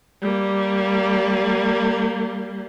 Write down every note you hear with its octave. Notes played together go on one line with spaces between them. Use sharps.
G3 A#3